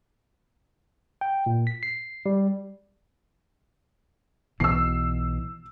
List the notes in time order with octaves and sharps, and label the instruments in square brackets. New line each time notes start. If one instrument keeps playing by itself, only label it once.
[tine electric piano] G5
A#2
B6
C7
G3
[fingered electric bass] B1 B2 E3 [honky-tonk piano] E6 C7